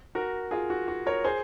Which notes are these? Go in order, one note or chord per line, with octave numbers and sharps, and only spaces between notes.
F#4 A#4
F4 G#4
F#4
F#4
A#4 C#5
G#4 C5